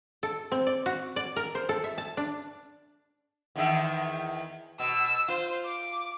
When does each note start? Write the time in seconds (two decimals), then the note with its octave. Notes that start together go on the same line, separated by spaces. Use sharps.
0.23 A4
0.52 C4
0.67 D5
0.86 F#4
1.16 D5
1.36 A#4
1.55 C5
1.69 A4
1.84 E5
1.98 A5
2.17 D4
3.56 E2 D#3 E5
4.80 B2 E6
5.28 F4 C5
5.65 D6